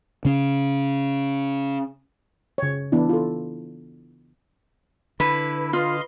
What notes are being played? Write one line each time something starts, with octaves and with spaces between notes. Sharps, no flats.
C#3 C#4
C#3 C#5
E3 B3 D4 E4
F4 A4
D3 E4 B4
F4 D#5 F5 C6